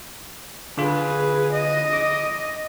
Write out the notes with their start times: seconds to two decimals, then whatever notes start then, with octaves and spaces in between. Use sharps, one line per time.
0.78 D3 F4 G#4 B4
1.52 D#5
1.93 D6